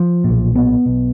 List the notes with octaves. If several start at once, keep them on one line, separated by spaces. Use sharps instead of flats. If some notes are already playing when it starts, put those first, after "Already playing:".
Already playing: F3
B1 A#2
B3
B1 B2